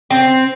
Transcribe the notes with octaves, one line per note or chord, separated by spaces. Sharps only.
C4